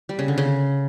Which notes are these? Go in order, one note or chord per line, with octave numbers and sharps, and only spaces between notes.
G3
C#3
D3
C#3